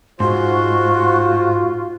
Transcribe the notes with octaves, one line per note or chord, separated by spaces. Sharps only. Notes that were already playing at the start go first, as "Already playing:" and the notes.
G#2 F4 F#4 C5